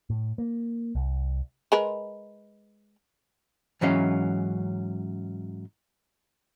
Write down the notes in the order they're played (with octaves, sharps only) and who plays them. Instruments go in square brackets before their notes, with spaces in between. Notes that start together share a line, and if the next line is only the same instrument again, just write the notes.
[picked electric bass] A2
A#3
C2
[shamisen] G#3 A#4 B4
[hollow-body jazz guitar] G#2 E3 F#3 C#4 F5